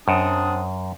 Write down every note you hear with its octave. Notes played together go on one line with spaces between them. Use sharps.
F#2 C4 D4 D#6